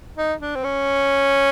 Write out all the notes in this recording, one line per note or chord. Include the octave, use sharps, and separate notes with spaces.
D#4
D4
C4
C#4